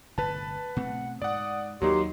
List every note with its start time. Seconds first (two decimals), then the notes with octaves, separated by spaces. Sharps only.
0.18 G1 A2 C3 B4 A5
0.76 B2 A3 C4 F#5
1.22 G#2 D5 F#5 D#6
1.82 D#2 F#3 A#3 D#4 G4 C6